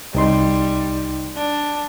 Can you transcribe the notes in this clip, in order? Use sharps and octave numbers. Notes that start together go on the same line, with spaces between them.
C2 G3 D#4 C6
D4